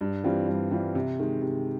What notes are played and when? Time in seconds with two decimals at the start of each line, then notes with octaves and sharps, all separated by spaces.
0.01 G2
0.24 E3 G3 C4 F4
0.48 G2
0.71 E3 G3 C4 F4
0.95 C3
1.19 D#3 G#3
1.42 C3